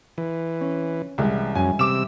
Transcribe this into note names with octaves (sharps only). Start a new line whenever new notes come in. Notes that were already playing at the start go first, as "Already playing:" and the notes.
E3
C#4
C2 E3 G3 G#3
F#2 G#5
C3 D6 E6 E7